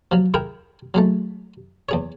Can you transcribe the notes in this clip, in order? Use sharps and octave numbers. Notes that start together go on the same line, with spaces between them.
F3 F#3
E4 G#4 A#4 G5
F#3 G#3 A3
E2 G#4 C#5